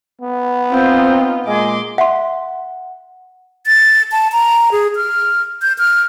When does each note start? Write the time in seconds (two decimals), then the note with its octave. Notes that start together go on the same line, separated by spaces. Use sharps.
0.21 B3
0.72 C4 D#4 F4 C5
1.47 A#2 G#3 D#5 G#5 C6 D6
1.98 E5 F#5 C6
3.67 A6
4.12 A5
4.32 A#5
4.72 G#4
4.96 F6
5.62 G6
5.79 F6